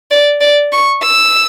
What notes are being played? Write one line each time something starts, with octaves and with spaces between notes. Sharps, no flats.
D5
D5
C#6
E6